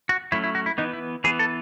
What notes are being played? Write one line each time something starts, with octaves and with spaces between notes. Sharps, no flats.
F#4
F#3 A3 C#4 E4
E4
F#4
E4
E3 B3 D#4
E4
E3 B3 G#4
A4